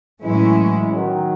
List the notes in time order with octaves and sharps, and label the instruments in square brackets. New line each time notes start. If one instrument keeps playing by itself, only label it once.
[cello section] A2 F#3 C#4 E4 [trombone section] E3 G#3
[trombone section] D#3 F#3